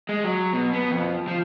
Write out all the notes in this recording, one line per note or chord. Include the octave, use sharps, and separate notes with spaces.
G#3
F#3
B2
B3
F2
F3